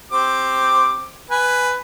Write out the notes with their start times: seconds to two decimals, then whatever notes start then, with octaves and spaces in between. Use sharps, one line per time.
0.11 C4 G4 D6
1.30 B4 G#5